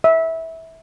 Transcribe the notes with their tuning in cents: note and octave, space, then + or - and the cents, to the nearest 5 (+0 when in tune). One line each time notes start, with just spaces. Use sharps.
E5 -20